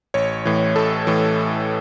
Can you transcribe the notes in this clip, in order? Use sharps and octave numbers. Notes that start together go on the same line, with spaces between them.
A1 C#5
A2 E3
A1 A4
A2 E3